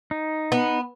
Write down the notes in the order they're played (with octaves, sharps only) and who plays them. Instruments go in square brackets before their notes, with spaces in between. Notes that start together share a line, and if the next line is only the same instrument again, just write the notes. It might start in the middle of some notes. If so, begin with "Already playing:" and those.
[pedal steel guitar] D#4
[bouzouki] B3